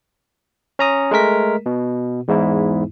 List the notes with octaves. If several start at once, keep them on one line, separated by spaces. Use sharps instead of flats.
C#4 A#5 D#6
G#3 A3 A#4 B6
B2
E2 G#2 E4